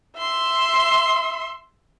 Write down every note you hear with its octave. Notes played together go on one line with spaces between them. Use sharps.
E5 C6